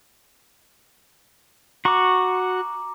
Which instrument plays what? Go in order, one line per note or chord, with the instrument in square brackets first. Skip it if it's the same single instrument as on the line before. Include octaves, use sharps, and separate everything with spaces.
[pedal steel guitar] F#4 C#6 [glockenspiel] A#5 D6